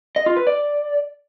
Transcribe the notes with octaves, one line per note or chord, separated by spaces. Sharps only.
D#5
F4
B4
D5